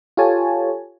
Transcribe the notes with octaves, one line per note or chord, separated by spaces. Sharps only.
F4 G4 A4 C#5 G#5 A5